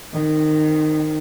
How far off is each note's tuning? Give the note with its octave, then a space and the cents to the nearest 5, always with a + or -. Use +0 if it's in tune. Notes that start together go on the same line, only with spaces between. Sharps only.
D#3 -15 C4 +0